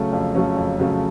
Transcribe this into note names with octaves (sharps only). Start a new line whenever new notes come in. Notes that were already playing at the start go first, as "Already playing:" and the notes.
Already playing: C#3 F#3 A3 C#4
F2
C#3 F#3 A3 C#4
F2
C#3 F#3 A3 C#4